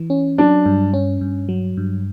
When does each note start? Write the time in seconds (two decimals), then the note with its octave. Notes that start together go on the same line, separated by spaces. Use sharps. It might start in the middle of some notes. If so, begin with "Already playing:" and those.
Already playing: E3
0.10 C#4
0.38 F#3 D4
0.66 G2
0.94 C#4
1.21 G2
1.49 F#3
1.77 G2